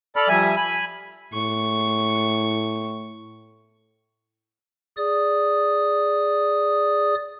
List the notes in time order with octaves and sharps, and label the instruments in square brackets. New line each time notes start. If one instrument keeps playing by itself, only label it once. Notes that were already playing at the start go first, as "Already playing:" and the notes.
[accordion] A4 D5 B5 F6
F3 G3 E5 G#5
G#5 B5
[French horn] A2 [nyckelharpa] C#6
[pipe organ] G#4 D5 D#6